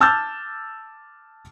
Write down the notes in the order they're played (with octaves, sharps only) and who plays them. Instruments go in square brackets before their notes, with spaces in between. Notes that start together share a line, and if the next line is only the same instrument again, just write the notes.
[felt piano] A5 D6 E6 F6 G6 A6